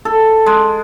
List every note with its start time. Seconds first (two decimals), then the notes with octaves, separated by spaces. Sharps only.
0.05 A4
0.46 G#3